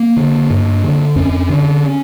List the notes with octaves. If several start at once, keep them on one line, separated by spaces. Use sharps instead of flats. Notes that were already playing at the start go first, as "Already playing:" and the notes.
Already playing: A#3
D3
G2
D3
F2 C#4
D3